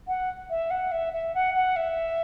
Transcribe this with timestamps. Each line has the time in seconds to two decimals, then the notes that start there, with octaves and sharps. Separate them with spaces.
0.07 F#5
0.49 E5
0.70 F#5
0.91 E5
1.13 E5
1.34 F#5
1.54 F#5
1.76 E5